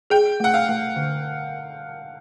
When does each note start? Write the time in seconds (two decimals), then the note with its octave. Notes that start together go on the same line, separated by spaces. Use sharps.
0.10 G#4 G5
0.40 A3 F#5
0.54 F5
0.68 A3
0.96 D3